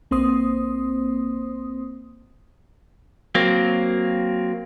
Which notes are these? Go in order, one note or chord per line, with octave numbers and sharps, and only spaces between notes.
B1 A#3 C4 C5 C6 D#6
F#3 A#3 C4